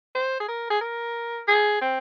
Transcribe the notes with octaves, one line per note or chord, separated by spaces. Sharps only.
C5
G#4
A#4
G#4
A#4
G#4
C4